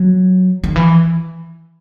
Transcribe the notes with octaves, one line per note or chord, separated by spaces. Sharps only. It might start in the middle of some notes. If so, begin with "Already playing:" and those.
Already playing: F#3
D#3
E3